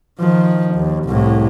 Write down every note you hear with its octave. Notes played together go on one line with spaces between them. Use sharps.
D#3 F3
D#2
C2 A2